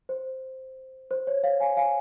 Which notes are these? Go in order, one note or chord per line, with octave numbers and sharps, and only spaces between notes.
C5
C5
C#5
C#5 F5
F5 G#5
F5 G#5